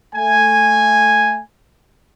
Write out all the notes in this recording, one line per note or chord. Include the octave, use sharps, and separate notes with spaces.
A3 G#5